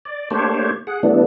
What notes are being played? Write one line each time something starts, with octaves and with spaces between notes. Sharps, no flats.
D5
A3 A#3 D4 G4 C5 C#5
G#4 F#5
E3 G3 A3 B3 D4